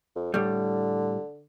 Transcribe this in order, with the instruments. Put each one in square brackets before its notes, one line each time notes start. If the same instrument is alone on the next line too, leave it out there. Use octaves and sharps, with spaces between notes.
[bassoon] F2
[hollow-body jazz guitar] A2 G3 [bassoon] D3